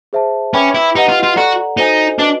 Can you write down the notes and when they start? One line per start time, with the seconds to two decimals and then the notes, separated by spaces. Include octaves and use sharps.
0.13 G#4 C5 E5 A5
0.54 C#4 B4 E5 G5 B5 D6
0.75 E4
0.95 D#4 G4 B4 D#5 F#5
1.09 F4
1.23 F4
1.36 F#4 A4 D5 F#5 A#5
1.77 D#4 F#4 A4 C5 D#5 G#5
2.19 D4 F#4 B4 D#5